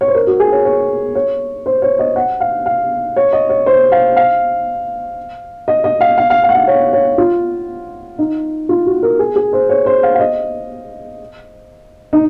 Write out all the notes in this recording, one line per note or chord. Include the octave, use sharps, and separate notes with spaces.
C#5
C5
A#4
F#4
G#4
C#5
C#5
C#5
C5
C#5
D#5
F#5
F5
F5
C#5
D#5
C#5
C5
F5
F5
D#5
D#5
F5
F5
F5
F5
F#5
F5
C#5
C#5
F4
D#4
F4
F#4
A#4
G#4
G#4
C5
C#5
C5
F5
F5
D#5
D#4